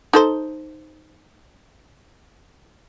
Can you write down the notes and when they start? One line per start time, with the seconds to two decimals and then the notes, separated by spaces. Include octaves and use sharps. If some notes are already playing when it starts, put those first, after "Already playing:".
0.13 D#4 A4 C5